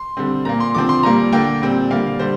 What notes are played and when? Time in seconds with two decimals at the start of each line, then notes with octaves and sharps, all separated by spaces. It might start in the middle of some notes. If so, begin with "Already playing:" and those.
Already playing: C6
0.17 D3 G3 C4
0.45 A#2 A#3 A#5
0.60 C6
0.74 D3 F3 C4 D6
0.89 C6
1.03 A#2 G3 A#3 A#5
1.32 D3 A#3 G5
1.62 A#2 G3 C4
1.90 D3 G3 A#3 F5
2.19 D3 G3 C5